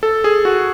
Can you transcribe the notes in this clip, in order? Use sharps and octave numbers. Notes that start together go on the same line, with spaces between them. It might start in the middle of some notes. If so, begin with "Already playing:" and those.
A4
G#4
F#4